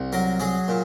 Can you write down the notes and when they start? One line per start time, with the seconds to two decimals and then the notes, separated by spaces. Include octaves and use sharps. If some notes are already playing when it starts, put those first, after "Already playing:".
Already playing: C2
0.13 F#3 A#4
0.40 F#3 G#4
0.68 A#2